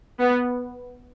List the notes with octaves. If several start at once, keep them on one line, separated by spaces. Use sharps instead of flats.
B3